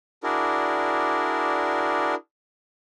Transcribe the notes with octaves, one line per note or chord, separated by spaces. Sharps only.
D4 E4 F#4 G#4 A#4 D5